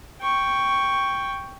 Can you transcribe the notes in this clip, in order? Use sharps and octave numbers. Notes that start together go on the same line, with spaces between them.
G5 C#6